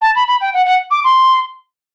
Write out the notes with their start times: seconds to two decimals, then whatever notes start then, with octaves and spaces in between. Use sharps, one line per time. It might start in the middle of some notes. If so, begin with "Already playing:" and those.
0.01 A5
0.15 B5
0.27 B5
0.40 G5
0.53 F#5
0.65 F#5
0.90 D6
1.04 C6